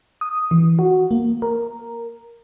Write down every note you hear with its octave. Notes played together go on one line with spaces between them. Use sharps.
D#6
E3
F#4
A#3
A#4